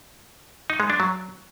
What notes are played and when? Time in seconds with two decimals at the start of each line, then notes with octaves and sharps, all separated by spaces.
0.70 D#4
0.80 G#3
0.90 D4
1.00 F#3